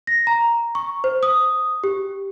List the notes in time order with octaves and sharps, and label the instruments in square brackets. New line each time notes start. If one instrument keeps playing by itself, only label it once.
[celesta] A#6
A#5
C#6
C5
D#6
G4